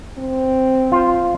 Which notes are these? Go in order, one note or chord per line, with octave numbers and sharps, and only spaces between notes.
C4
F4 C5